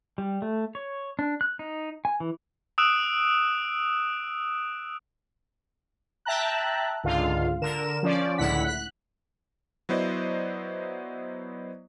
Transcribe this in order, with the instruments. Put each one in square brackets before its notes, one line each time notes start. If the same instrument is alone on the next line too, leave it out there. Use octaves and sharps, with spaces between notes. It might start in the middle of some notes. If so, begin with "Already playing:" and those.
[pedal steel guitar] G3
A3
C#5
D4
F#6
D#4
G#5
E3
[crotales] D#6 E6 F#6 D7 E7
[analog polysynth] E5 G5 A5 A#5 F#6
C#2 G#2 D3 F4 F5
D3 A#4 E7
F3 C#4 D5
C#2 A2 D3 E4 F#5 B6
F#6
[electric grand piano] F#3 B3 E4 C5 D5 D#5